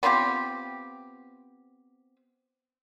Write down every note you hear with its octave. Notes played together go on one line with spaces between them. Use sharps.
B3 C4 F4 G4